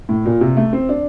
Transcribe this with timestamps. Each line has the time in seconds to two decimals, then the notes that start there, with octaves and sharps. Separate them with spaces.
0.09 A2
0.26 A#2
0.41 C3
0.57 A3
0.73 C4
0.89 D4